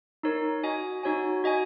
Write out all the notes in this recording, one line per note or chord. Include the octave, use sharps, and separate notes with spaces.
D#4 A#4 C#5
F#4 D#5 G#5
D#4 F#4 C#5 G#5
F#4 D#5 G#5